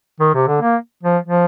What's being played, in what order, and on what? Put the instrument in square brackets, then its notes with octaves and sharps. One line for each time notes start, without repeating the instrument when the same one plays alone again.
[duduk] D#3
C3
D3
A#3
F3
F3